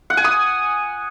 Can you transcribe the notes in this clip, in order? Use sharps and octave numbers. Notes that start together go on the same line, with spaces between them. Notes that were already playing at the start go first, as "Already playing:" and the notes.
F#5
G#5
D#6